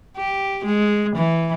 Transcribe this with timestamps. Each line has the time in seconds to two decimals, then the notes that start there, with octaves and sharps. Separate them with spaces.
0.17 G4
0.65 G#3
1.16 E3